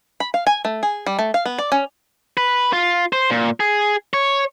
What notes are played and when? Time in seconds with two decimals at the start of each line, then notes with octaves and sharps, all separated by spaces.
0.20 B5
0.34 F5
0.47 G#5
0.65 A3
0.83 G#4
1.06 G3
1.19 A3
1.34 F5
1.45 B3
1.59 D5
1.72 C#4
2.37 B4
2.73 F4
3.13 C5
3.30 A#2
3.60 G#4
4.13 C#5